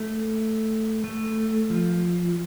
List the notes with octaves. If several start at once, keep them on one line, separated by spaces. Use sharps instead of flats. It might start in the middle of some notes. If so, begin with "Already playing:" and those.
Already playing: A3
A3
F3